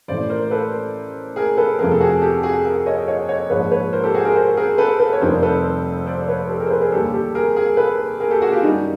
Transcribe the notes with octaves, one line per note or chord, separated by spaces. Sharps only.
A1 A2 E3 A3 C5 D5
A#4 C5
A4 B4
G#4 A#4
A4 B4
F2 C3 F3 A3 G#4 A#4
A4
F#4 G#4
G4 A4
F#4 G#4
G#4 A#4
C#5 D#5
C#5 D#5
C#5 D#5
A#1 G#2 F3 G#3 B4 C#5
B4 C#5
A#4 C5
G4 A4
F#4 G#4
G#4 A#4
A#4 C5
G#4 A#4
A4 B4
A4 B4
C#5
F1 F2 C3 D#3 G3 A#4 C5
A4 B4
C5 D5
B4 C#5
G4 A4
G#4 A#4
C5
A4 B4
G#4 A#4
D#2 D3 G3 G4 A4
G4 A4
G#4 A#4
G#4 A#4
A4 B4
G#4 A#4
G4 A4
F#4 G#4
F4 G4
F#2 D#3 G3 D#4